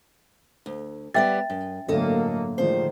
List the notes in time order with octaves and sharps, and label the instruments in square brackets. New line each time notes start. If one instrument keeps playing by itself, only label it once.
[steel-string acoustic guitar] D2
[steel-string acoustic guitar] G3 B3 D5 [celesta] E5 G5 A6
[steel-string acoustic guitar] F#2
[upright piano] G1 A2 D3 [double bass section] F#3 A#3 [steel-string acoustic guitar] A4 D#5
[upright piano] A2 F3 G#3 [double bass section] D3 D#3 [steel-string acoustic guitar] C5